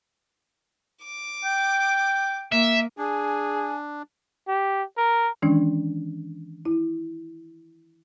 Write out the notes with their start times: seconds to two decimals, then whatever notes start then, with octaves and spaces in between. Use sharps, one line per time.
1.04 D6
1.45 G5
2.52 A#3 E5
2.98 D4 G#4 G#5
4.48 G4
4.97 A#4
5.42 D#3 E3 G#3 C#4 D4
6.65 E4